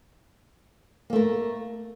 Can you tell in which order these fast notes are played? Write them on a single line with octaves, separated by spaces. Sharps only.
A#3 A3 A#4